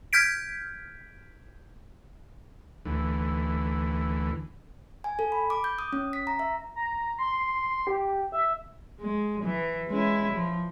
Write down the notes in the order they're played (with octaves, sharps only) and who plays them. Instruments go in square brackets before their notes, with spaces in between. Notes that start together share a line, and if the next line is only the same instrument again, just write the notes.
[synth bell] F6 G6 G#6 B6 D7
[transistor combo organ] D2 E3
[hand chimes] G#5
A4
B5
D6
G6
D#6
C#4
B6
A#5
E5
[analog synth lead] A#5
C6
G4
E5
[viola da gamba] G#3
E3
G#3 C#4 E4
F3